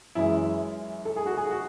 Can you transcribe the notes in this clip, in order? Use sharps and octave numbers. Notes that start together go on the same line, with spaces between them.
F#2 E3 G#3 E4
A4
G#4
F#4
G#4
F#4